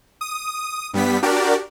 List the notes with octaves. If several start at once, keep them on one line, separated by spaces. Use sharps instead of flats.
D#6
G2 G3 B3 B6
D4 F#4 G4 A#4 D5